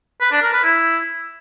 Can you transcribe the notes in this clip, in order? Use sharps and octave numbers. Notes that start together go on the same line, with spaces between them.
B4
D4
A#4
B4
E4